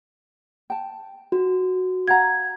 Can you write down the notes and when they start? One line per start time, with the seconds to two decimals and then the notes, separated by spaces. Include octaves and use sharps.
0.70 G5 A5
1.32 F#4
2.08 F5 F#5 A#5 G#6